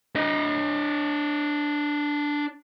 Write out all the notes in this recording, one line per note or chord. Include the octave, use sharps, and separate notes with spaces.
D4 D#5